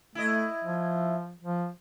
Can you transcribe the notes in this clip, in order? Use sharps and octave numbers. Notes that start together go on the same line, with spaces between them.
A3 E4 D#5
F3
F3